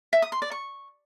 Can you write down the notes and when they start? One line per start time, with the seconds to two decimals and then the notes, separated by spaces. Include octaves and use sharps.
0.13 E5
0.22 D#6
0.32 C6
0.42 D5
0.51 C#6